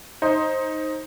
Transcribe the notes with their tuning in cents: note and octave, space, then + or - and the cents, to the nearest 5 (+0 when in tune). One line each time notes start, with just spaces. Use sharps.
D#4 +0 C5 +15